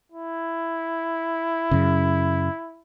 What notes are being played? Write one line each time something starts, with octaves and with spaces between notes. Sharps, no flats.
E4
F#2 C#3